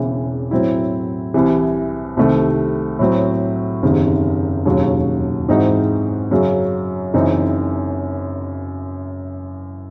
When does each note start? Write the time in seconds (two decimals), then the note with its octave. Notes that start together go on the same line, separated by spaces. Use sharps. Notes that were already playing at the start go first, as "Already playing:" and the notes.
Already playing: E1 E2 C#3 E3 C4
0.51 A2 F#3 C4 E4
1.34 C2 C3 E3
2.17 C2 C3 D#3 A3 C4
2.99 A2 F#3 C4
3.82 F#1 E2 C3 D#3
4.65 E1 D#2 C#3 F#3
5.48 G#2 E3 C4 D#4 F#4
6.31 F#2 C#3 F#3
7.14 F#1 F#2 E3 C4 D#4